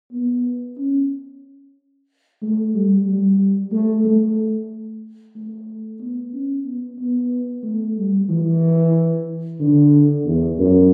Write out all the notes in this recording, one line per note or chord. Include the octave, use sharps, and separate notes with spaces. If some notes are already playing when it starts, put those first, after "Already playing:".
B3
C#4
A3
G3
G3
A3
A3
A3
B3
C#4
B3
B3
A3
G3
E3
D3
E2
F#2